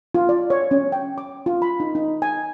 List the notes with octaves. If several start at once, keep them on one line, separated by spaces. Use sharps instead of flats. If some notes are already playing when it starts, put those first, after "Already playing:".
F4
D5
C#5
C#4
G5
D6
F4
B5
D#4
D#4
G#5